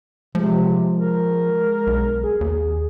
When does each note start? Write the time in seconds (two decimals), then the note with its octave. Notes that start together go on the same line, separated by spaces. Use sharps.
0.35 C3 F3 G#3
0.97 A#4
1.87 B1
2.23 G#4
2.41 D#2